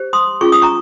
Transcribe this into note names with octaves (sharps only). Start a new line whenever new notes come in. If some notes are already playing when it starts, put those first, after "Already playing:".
Already playing: G4 C5
C6 D#6
C#4 F4 G#4 C#6
D#6
A#5 C#6